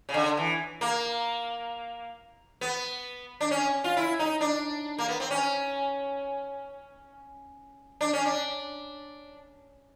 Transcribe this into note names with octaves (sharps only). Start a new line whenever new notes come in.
C#3
D3
E3
A#3
B3
D4
C#4
F4
E4
D#4
D4
A#3
B3
C4
C#4
D4
C#4
D4